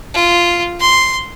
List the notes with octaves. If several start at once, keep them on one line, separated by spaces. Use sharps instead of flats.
F4
C6